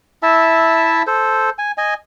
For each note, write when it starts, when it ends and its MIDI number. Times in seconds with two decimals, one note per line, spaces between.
0.23 1.02 64
0.23 1.02 76
0.23 1.02 81
0.23 1.02 88
1.07 1.50 69
1.07 1.50 72
1.58 1.72 80
1.78 1.94 75
1.78 1.94 80